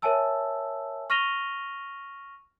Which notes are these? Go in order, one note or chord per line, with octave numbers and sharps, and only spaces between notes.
A#4 C#5 E5 G#5 A5 E6
C#6 F6 A#6 D#7 F7 G7